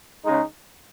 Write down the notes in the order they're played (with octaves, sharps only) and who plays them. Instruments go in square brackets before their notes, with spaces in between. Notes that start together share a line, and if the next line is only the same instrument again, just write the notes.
[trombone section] C#3 G#3 D#4